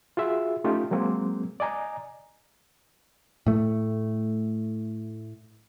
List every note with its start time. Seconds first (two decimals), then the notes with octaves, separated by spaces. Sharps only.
0.17 F4 F#4 G#4 E5
0.64 A3 C#4 D#4 F4 G4
0.91 F#3 G#3 A#3 C4
1.60 D5 D#5 G#5 A#5
3.46 A2 A3